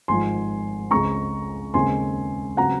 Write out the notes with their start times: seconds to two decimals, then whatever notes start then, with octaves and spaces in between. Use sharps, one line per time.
0.08 G#1 G#2 F3 G#5 C6
0.91 C#2 C#3 G#3 C4 A#5 C#6
1.74 D#2 C#3 G#3 C4 G#5 C6
2.57 C#3 F#3 C4 F#5 A#5